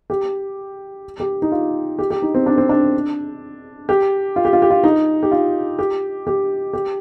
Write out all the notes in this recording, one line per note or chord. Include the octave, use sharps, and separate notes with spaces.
G4
G4
D#4
F4
G4
G4
D#4
C4
D4
C4
D4
G4
F4
G4
F4
G4
F4
D#4
G4
F4
G4
G4
G4